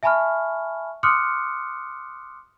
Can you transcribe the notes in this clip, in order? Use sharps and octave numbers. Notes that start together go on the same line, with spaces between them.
E5 G#5 A5 B5 C#6 F6
C6 D6 D#6 F6 F#6 C#7